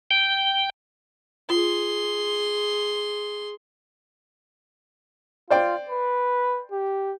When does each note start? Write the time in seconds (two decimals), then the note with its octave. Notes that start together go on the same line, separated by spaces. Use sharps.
0.11 G5
1.50 F4 G#4 C6
5.50 F4 C5 D5 G5
5.89 B4
6.72 G4